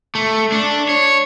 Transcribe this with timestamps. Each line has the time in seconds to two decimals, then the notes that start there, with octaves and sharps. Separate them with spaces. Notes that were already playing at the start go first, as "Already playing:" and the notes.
0.15 A3
0.52 D4
0.89 C#5